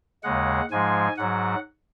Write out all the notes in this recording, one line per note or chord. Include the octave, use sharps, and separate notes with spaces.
D#2 C#3 G#3 F#5
G#2 F3 G#3 G#5
G#2 F#3 F#5